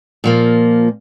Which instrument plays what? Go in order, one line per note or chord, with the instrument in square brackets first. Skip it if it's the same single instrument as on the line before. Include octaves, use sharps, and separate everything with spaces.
[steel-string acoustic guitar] A#2 F3 A#3